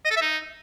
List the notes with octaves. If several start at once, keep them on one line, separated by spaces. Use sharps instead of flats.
D#5
A4
E5
D#4